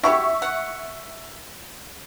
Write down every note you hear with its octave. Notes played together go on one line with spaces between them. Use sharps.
E4 F#4 G4 E5 C#6
F#5